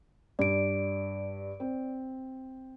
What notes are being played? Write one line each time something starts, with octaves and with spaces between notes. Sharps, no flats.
G2 D5 D7
C4